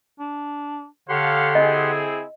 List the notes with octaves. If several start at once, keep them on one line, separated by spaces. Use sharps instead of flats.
D4
D3 G4 A4 C#5 F5 F#5 C6
C4 E4 G#4 D#5